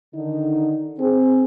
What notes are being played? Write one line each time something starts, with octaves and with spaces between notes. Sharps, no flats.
D3 D#3 D#4
C4 G#4